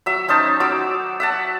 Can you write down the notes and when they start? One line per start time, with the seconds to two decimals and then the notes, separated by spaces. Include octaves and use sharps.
0.06 F#3 E5
0.28 C#4 D#4 C5 A5
0.60 F#3 D6 E6
1.20 E5 F#5 A5